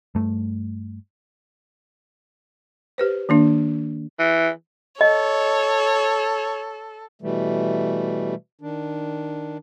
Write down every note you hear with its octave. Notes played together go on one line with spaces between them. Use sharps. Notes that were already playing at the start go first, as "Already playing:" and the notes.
G2 A3
G4 B4 C5
D#3 A#3 D4
E3
A4 C#5 D#5
B2 E3 G3 A3
D#3 D4